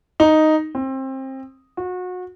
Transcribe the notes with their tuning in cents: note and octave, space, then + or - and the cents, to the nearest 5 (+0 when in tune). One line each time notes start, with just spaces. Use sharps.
D#4 +0
C4 +25
F#4 -30